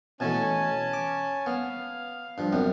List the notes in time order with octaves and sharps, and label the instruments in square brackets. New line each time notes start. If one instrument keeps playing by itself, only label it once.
[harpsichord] B2 E3 A3 [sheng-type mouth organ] C#4 G#5 A5
[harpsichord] D6
[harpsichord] B3 [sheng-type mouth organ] F5
[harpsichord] G2 F3
F#2 C3 B3